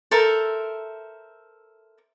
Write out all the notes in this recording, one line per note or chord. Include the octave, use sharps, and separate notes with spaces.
A4 A#4 C5 E5